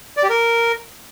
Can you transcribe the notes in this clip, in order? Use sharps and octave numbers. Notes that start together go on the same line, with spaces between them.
D5
G4
A#4